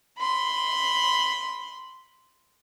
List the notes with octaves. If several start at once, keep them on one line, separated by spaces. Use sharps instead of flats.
B5 C6